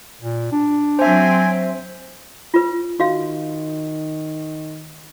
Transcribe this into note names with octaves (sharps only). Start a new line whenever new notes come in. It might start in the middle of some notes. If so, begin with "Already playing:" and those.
A#2
D4
F#3 C4 C5 E5 G#5
F4 B4
D#3 F#4 F5